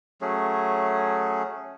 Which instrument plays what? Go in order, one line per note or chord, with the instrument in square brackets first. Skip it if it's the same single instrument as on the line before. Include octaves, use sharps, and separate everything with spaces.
[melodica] F#3 A3 C#4 G#4